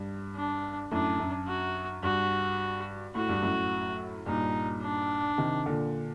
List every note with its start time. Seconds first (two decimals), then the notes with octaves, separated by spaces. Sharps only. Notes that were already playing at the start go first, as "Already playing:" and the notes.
Already playing: G2
0.36 D4
0.91 F#2 A2 D4
1.20 F#2
1.47 F#4
2.03 G2 F#4
3.15 A2 F#4
3.29 G2
3.42 F#2 A2
4.26 G2 A#2 D#4
4.82 D4
5.38 C3 D#3
5.66 A#2 D3